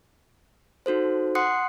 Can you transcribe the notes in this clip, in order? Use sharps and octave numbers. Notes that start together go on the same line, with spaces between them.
D#4 F#4 A4 C5
F#5 C6 D#6 F#6 C7 C#7